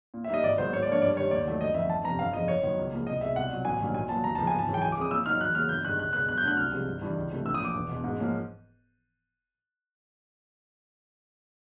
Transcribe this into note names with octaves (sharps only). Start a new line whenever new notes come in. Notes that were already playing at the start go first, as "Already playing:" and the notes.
A#2
E5
G3 A#3 D#4 D#5
G#1 D5
G#2 D#3 F#3 B3 C5
G#2 C#5
D5
F3 A#3 D4 C#5
G2 D5
D#3 G3 C#5
D#2 D5
D#3 F#3 A3
G1 D#5
F2 E5
D3
G1 A5
F2 C3 A#5
G1 F5
F2 C#3 F3 D#5
F#1 C#5
F#2 D#3 F#3 B3
C#2
C#3 F3 A#3
C2 D#5
B2 G#3 E5
C2 F#5
B2 F#3
A1 G#5
G2 D#3 F#3 A#3
B1 G#5
A#2 F#3 B3 A5
D#2 A#5
C#3 F3 G#3 B3 A5
G#5
G#1
A5
F#2 C#3 E3
G5
C#2 G#5
D6
C#3 F3 G#3 C4 D#6
A#2 E6
F#3 A#3 D#4 F6
E2 F#6
C#3 F#3 A#3 F6
G1 G6
G2 D#3 G#3 F#6
C#2 F#6
B2 G#3 B3 F#6
F#2 F#6
G6
D3 F#3 A3 D4 F#6
C2 F6
C3 F3 G#3 C4
G1
G2 E3
C#2
C3 E3 A3
A#1 E6
D#6
A#2 F3 D6
E1
E2 B2
G#2
F3 A#3 C#4